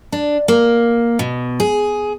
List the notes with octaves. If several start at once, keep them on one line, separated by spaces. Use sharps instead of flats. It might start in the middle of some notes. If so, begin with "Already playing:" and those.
D4
A#3
B2
G#4